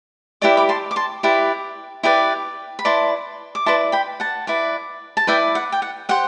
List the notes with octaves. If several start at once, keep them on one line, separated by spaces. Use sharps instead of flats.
E4 G4 B4 D5 D6
B5 D6
A5 C6
D6
A5 C6
E4 G4 B4 D5
E4 G4 B4 D5
B5
E4 B4 D5 A5 C6
D6
E4 B4 D5 A5 C6
G5 B5
F#5 A5
E4 B4 D5
A5
E4 B4 D5 E5 G5
F#5
G5
F#5
G4 C5 F#5